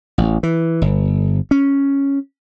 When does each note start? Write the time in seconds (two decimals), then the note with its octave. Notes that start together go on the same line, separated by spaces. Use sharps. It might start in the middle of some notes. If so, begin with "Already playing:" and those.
0.18 A1
0.43 E3
0.82 G1
1.51 C#4